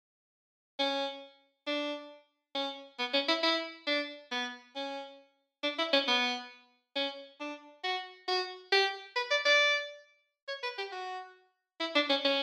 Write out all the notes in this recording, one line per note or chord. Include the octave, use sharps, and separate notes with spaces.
C#4
D4
C#4
B3
C#4
E4
E4
D4
B3
C#4
D4
E4
C#4
B3
C#4
D4
F#4
F#4
G4
B4
D5
D5
C#5
B4
G4
F#4
E4
D4
C#4
C#4